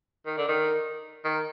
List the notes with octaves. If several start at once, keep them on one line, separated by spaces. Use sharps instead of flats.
D#3
D3
D#3
D#3